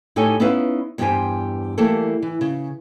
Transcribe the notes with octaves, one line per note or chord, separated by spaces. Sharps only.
A2 D#4 G4 A4 C#5 G#5
B3 C#4 D#4 E4 B4 F5
E2 G2 G3 G4 C5 G#5
E3 G3 A3 A#3 A4
E3
C#3